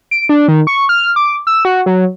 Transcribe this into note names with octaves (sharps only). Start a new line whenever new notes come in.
D7
D4
D#3
C#6
F6
D6
E6
F#4
F#3